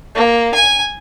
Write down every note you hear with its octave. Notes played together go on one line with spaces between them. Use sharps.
A#3
G#5